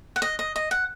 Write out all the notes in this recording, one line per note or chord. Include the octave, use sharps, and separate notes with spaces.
F#5
D#5
D#5
D#5
F#5